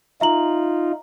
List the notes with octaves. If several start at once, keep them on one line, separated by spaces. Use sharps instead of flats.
D#4 F4 E5 A#5 F#7